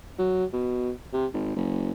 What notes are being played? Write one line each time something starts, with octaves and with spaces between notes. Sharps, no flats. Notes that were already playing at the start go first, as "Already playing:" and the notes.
F#3
B2
C3
G#1
F#1